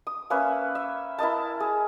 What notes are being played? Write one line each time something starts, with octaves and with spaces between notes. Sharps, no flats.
D#6
A#3 C#4 B4 E5
E5
E4 A#4 D#5 A5
G#4